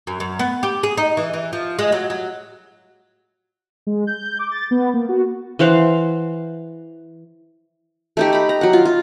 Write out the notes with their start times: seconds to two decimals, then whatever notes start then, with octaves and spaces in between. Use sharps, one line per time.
0.07 F#2
0.20 F#2
0.39 B3
0.63 G4
0.83 G#4
0.97 D#4
1.17 E3
1.33 E3
1.53 F3
1.79 G#3
1.92 F#3
2.10 F#3
3.87 G#3
4.07 G6
4.39 D6
4.51 A6
4.71 B3
4.94 A#3
5.09 F#4
5.59 E3 C5 F5 F#5
8.17 A3 D#4 G4
8.33 A#5 B5
8.49 A#5
8.61 F#3 F#5
8.73 F4
8.85 F4